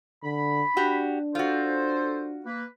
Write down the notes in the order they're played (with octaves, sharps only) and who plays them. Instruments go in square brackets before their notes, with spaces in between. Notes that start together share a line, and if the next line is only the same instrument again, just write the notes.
[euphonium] D3 [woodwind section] B5
[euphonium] D4 [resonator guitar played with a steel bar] F#4 G4
[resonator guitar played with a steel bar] F4 F#4 [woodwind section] A4 C5
[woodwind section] A#3 B4